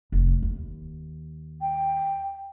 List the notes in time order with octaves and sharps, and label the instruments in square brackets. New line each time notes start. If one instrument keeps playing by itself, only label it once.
[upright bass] F1
D#2
[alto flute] G5